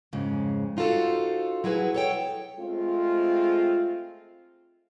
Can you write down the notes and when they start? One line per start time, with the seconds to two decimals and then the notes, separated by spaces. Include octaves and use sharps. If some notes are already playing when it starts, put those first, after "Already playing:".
0.13 F2 G#2 C#3
0.77 D#4 F4 F#4 A4 C5
1.64 F#3 E4 G#4 B4
1.94 A4 C#5 G5
2.59 G#3 A3 C4 F4